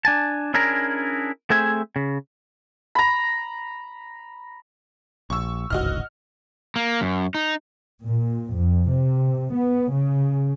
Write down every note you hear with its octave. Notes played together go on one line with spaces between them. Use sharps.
D4 G#5 A5
C#4 D4 E4 G#4 A#4 A#5
A3 C4 G#4 C5 E5 G#5
C#3
A#5 B5
A#1 C#6 E6
D1 G#1 C#2 F#4 D#5 F6
A#3
F#2
D#4
A#2
F2
C3
B3
C#3